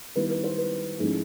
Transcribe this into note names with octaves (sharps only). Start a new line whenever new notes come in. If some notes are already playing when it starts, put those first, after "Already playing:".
D#3 G3 B3 E4 B4
B4
C5
B4
G#2 F3 A3 C#4 E4 G#4